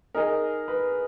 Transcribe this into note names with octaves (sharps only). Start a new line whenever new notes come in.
D#4 G#4 A#4 D#5
B4